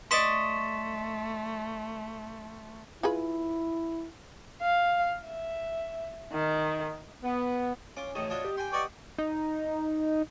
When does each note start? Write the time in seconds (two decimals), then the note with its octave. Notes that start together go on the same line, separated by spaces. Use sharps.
0.11 A3 D5 D#5 C6 C#6 B6 E7
3.03 E4 F4 G#4 B4
4.61 F5
5.25 E5
6.32 D#3
7.22 B3
7.97 C#4 F4 D6
8.15 A1 D#3 A3 C#5 D#5
8.30 D4 F4 F#4 D#5
8.45 G4
8.57 G5 G#5 C6
8.73 B4 D5 D#5 F#5 C#6
9.18 D#4